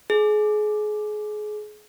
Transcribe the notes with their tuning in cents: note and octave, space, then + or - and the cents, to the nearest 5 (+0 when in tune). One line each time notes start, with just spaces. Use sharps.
G#4 +30